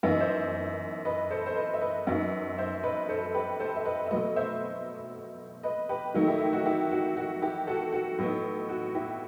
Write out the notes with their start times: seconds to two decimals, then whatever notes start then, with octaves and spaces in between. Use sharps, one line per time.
0.03 F#2 E3 B3 D#4 E5
0.12 D#5
0.20 C5 E5
1.05 B4 D#5
1.31 A4 C5
1.46 C5
1.56 B4 D#5
1.74 E5
1.81 B4 D#5
2.07 F#2 F#3 B3 D#4
2.58 C5 E5
2.83 B4 D#5
3.09 A4 C5
3.34 G4 B4
3.60 A4 C5
3.76 E5
3.85 B4 D#5
4.06 E5
4.11 B2 F#3 A3 B4 D#5
4.36 C5 E5
5.63 B4 D#5
5.89 G4 B4
6.14 D#3 F#3 A3 D#4
6.27 E4 G4
6.40 E4
6.53 F#4
6.66 E4 G4
6.91 F#4
7.17 F#4
7.42 E4 G4
7.67 F#4 A4
7.93 F#4
8.18 A2 F#3 B3 D#4
8.69 F#4
8.95 E4 G4